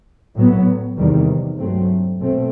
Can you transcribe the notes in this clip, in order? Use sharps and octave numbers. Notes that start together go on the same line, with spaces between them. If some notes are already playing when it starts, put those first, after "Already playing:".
A2 F#3 B3
E2 C3 D#3 G3
G2 F#3 A3 C4
B2 A3 C4